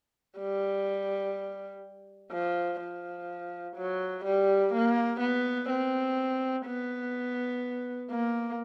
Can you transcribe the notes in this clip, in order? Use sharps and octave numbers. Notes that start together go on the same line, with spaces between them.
G3
F3
F3
F#3
G3
A#3
B3
C4
B3
A#3